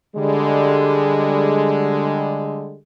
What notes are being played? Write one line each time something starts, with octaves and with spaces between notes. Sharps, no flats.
D3 G3 G#3